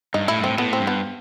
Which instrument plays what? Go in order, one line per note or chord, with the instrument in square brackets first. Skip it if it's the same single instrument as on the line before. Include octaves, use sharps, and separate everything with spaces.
[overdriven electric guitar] G2 [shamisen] D#4
[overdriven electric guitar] A2 [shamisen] E4
[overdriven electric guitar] G2
[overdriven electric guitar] A2 [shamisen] C4
[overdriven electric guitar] A2 [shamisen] B3
[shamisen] C4
[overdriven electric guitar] G2
[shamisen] B3